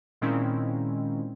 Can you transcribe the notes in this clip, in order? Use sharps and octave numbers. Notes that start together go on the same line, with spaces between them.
A#2 D#3 G#3 C4 C#4 E4